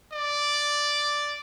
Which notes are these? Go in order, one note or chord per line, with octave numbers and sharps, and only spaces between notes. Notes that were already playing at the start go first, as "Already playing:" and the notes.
D5